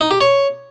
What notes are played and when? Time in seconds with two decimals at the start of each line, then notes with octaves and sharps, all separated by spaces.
0.01 D#4
0.11 G4
0.21 C#5